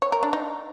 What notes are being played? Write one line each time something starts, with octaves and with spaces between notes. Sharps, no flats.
C#5
A#4
D4
D#4